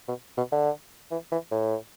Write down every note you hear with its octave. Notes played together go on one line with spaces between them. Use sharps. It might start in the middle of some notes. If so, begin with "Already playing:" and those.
B2
B2
D3
E3
E3
A2